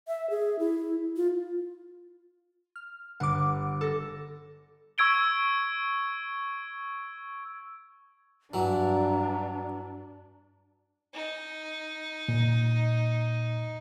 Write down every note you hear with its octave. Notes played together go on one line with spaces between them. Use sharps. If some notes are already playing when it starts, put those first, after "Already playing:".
E5
G#4
E4
F4
F6
G1 F#5 D6
A4 A#6
C#6 E6 G#6 D7 G7
G2 E3 F#3 D4 A#5
D#4
A#2